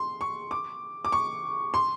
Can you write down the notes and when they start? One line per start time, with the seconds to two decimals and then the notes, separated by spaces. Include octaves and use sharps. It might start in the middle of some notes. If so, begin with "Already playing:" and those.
Already playing: C6
0.21 C#6
0.51 D6
1.05 D6
1.12 C#6
1.74 C6